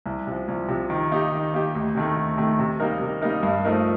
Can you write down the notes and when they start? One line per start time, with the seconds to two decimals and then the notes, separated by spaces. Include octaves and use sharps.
0.06 C2
0.27 C3 F3
0.48 C2
0.69 C3 F3
0.90 D#3
1.11 A#3 D#4 G4
1.32 D#3
1.53 A#3 D#4 G4
1.75 D2
1.95 C3 D#3 A3
2.16 D2
2.37 C3 D#3 A3
2.59 C3
2.80 G3 A#3 D#4 A#4
3.01 C3
3.21 G3 A#3 D#4 A#4
3.43 G2
3.65 F3 A3 D#4 A#4